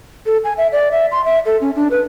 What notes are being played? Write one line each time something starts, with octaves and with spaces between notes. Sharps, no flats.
A4
G#5
E5
D5
E5
C6
E5
A4
C#4
D4
B4